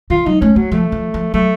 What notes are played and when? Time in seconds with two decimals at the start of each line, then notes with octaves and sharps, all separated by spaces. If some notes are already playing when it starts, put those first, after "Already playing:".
0.10 D#3 F4
0.26 F#3 D#4
0.41 A3 C#4
0.56 F#3 A3
0.72 F3 A3
0.92 F3
1.14 F3
1.34 F#3 A3